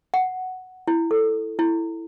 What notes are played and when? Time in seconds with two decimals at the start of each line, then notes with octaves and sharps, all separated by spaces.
0.14 F#5
0.88 E4
1.11 A4
1.59 E4